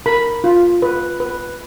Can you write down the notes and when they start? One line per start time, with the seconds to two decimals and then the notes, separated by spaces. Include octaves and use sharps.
0.06 A#4 B5
0.44 F4
0.82 B4
1.20 B4